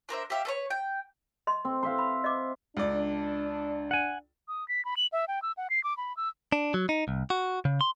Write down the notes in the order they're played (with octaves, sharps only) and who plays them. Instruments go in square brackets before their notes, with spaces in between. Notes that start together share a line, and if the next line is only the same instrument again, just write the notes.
[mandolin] D4 A#4 C5 E5
G4 E5 F5
A4 B4 C#5
G5
[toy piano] D#5 C6
[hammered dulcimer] C4
C5 E5 F5
[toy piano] B5
D#5 D6
[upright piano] C#2 D5 [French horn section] D4
[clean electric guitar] F#5 G#5
[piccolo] D#6
B6
B5
F#7
E5
G5
E6
F#5
C7
D6
B5
E6
[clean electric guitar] D4
F#3
D#4
C2
F#4
C#3
C6